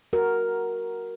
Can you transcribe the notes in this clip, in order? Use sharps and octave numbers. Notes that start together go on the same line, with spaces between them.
F#4 A#4